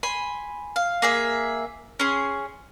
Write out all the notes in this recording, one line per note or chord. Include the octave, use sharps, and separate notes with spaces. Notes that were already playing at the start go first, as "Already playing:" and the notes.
G#5 B5 C6
F5
A#3 G#4 E5
C#4 G#4 C6